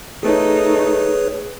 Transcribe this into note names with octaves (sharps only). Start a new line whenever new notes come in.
A3 D#4 G#4 B4 C#5